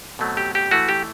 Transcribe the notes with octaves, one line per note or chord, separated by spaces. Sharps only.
B2 F#3 A3 C4
G4
G4
E3 A3 E4 F#4
G4